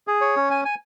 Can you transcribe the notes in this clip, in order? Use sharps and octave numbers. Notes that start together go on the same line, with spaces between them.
G#4
C#5
C#4
G#5
G#5